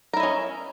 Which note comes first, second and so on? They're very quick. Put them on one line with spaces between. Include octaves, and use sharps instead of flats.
A#4 E4 D#5 C#4